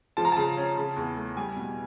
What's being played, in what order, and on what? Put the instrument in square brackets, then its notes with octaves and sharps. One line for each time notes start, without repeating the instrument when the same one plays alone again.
[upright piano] F3 A5
A#5
C#3 A5
C#4
C#3
E2
A3
G3 G#5
B2